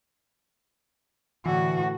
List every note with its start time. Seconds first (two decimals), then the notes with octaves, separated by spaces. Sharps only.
1.46 A2 D3 E3 F#4